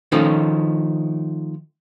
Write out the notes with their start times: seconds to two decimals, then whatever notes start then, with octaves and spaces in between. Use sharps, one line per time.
0.12 D#3 F3 A3 C#4 D#4